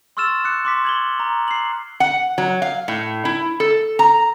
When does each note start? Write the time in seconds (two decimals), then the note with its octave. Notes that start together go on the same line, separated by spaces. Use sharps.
0.17 C6 C#6 E6 F6 A6 E7
0.44 D6 F#6 C#7
0.65 C6 D6 B6
0.85 G#6 F#7 G7
1.20 A#5
1.48 C7 F#7
2.00 F#5
2.38 F#3
2.62 F5
2.88 A2
3.25 E4
3.60 A4
3.99 A#5